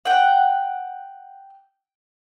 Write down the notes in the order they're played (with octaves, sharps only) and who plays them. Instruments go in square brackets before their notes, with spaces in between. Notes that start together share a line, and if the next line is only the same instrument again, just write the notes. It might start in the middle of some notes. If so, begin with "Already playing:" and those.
[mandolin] F#5 G5